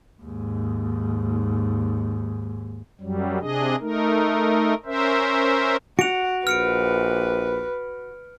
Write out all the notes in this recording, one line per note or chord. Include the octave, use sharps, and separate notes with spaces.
D#2 G#2
F#2 F#3 G3
C3 D4 G#4 D#5
A3 D#4 A#4
C#4 A#4 C5 E5
F#4 F#5 D7 F7
A#1 B4 F6 C#7 D7